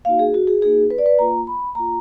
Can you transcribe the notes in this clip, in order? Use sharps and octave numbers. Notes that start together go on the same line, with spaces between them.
A#3 D#4 F#4 F5
G#4
F#4
G#4
A#3 D#4 F#4 G#4
B4
D5
B4
A#3 F4 A#5
B5
A#3 F4 A#5